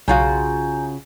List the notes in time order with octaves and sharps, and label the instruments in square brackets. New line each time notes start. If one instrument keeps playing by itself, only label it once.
[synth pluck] B1 F5 [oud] C#3 F4 F#4 [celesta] G#5 A#5 G6